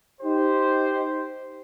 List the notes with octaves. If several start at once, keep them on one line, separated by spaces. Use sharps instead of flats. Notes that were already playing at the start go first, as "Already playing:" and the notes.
D#4 G4 C5